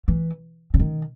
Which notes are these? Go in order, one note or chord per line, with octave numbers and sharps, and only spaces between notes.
E3
C#3
D#3